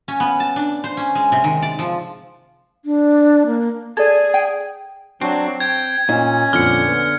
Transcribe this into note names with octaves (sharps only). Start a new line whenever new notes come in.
C#4
B3
A5
D4
C5
C#4
G#3
C3
D#3
D5
F3
D4
A#3
G#4 A4 D5 G#6
G5
F#3 C4 D4 F#4
G5 G6 G#6
A#2 C#4 D#4
F2 A#2 D3 F6 C#7
B3